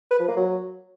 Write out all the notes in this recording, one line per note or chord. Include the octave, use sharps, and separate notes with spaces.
B4
F3
A#3
F#3